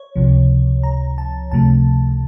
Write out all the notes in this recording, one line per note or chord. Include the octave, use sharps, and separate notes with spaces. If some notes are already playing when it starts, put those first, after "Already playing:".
Already playing: C#5
C#2 C3 F3
A#5
A5
C#2 C3 F3 A3 A5